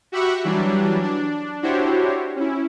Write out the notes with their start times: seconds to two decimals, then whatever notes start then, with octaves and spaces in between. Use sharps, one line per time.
0.12 F#4 G4 E5 F#5 B5 C#6
0.44 E3 F#3 G3 D4
1.03 D4
1.62 D4 E4 F#4 G4 C5 C#5
2.36 C#4 E4